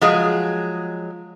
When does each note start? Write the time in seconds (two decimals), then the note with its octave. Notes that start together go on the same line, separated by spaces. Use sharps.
0.01 F3 F#3 G#3 G#4